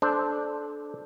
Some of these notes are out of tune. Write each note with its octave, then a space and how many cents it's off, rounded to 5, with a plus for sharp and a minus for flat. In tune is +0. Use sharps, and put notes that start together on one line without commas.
D4 +0 A4 -20 C5 +0